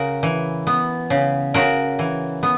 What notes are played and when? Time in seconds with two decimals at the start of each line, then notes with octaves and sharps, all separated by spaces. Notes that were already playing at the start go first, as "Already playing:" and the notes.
Already playing: C#3 F#4 A#4
0.23 E3
0.67 B3
1.10 C#3
1.54 C#3 F#4 A#4
1.99 E3
2.43 B3